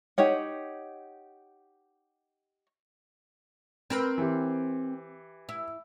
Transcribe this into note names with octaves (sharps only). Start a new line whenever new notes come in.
D#4 G4 C#5 F#5
C4 A#4 B4
E3 G4
E4